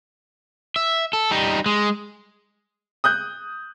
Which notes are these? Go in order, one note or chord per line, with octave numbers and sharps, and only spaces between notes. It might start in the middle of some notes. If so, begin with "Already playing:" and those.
E5
A4
G3 D#4
G#3
D#6 F#6 G6